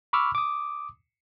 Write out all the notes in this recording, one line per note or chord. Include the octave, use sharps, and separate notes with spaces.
B5 C#6 D6 E6 F6
D6 D#6